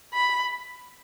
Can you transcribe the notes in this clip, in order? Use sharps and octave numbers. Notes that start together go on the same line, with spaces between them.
B5